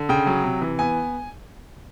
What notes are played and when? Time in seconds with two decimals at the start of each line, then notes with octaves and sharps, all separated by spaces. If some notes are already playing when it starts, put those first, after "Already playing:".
Already playing: D3
0.09 C#3 G5
0.27 F#3
0.44 C3
0.62 E3
0.79 B3 G#5